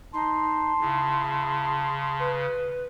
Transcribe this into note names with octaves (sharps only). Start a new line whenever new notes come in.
D#4 A5 C6
C#3 E4
B4